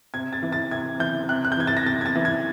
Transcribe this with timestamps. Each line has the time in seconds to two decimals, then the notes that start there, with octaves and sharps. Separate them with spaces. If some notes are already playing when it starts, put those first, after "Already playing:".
0.14 C3 G#6
0.33 A6
0.42 E3
0.52 A6
0.71 C3 G#6
0.99 E3 G6
1.29 C3 F#6
1.45 F#6
1.52 G6
1.57 E3 G#6
1.67 A6
1.77 A#6
1.86 C3 A6
2.01 G#6
2.06 A6
2.15 E3
2.25 G#6